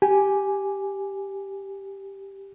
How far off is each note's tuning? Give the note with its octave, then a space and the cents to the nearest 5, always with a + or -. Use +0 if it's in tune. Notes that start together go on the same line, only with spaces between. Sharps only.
G4 +0 G#5 +0